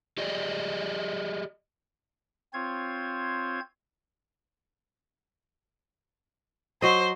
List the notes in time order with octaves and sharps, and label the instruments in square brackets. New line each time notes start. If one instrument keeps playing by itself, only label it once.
[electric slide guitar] G4 G#4 D5 D#5
[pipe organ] C4 F4 C5 C#5 G#6
[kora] F#3 D#5 [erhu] C5